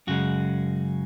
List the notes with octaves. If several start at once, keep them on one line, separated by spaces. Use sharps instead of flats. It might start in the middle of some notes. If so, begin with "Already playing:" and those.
F#2 C#3 G#3 F#4